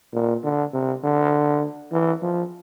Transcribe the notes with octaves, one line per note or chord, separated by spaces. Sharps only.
A#2
D3
C3
D3
E3
F3